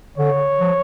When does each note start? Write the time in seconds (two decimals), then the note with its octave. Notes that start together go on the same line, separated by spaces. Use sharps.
0.18 D3 C#5
0.60 F3